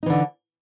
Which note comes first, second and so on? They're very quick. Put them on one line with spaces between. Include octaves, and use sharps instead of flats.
D#4 E3 D3